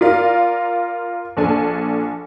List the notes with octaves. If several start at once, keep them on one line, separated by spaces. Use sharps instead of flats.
F4 A#4 D5 F5
A#1 D4 A4 G#5